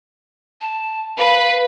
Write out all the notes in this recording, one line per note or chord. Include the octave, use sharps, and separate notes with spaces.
A5
B4 F5